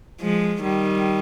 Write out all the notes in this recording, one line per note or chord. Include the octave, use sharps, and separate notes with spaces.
F3 G#3
D#3 G3